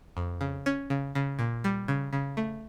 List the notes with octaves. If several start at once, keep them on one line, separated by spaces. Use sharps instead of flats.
F2
C#3
C#4
C#3
C#3
A#2
G3
C#3
C#3
A3